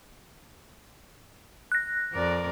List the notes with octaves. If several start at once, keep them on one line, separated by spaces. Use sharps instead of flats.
F#6 A#6
F2 A#4 D5